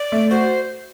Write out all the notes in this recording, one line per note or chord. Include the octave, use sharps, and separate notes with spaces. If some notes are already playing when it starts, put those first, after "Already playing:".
Already playing: D5
A3
F#4 C5